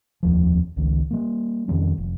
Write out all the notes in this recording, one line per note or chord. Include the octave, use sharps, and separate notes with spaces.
F1 D#2 F3
G#1 C#2 D#3
G3 A#3
F2 D#3 G3 C#4
F1